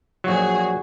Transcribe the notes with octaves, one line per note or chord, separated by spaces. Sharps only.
A#1 F#3 F#4 G#4